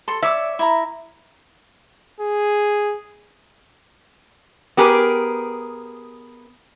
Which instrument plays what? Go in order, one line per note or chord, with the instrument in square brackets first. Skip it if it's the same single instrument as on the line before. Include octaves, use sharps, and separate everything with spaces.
[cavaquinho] A4 C6
[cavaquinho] C#5 D5 D6 [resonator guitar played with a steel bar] E5
[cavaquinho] E4 A#5
[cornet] G#4
[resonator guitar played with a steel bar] B3 G4 G#4 A#4